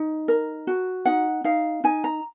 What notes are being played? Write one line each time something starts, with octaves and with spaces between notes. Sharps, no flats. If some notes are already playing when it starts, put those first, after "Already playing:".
Already playing: D#4
A#4
F#4
D#4 F#5
D#4 F5
D#4 G#5
A#5